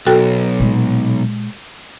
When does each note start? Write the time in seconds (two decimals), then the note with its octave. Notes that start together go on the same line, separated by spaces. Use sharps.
0.07 B1 F#4 A4 G5
0.60 A#2 G#3